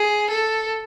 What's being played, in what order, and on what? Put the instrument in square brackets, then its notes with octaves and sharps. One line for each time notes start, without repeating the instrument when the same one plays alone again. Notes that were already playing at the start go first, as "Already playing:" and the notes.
Already playing: [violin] G#4
A4